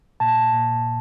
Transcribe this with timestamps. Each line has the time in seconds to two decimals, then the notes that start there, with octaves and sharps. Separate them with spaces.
0.20 A#2 A5
0.54 A#2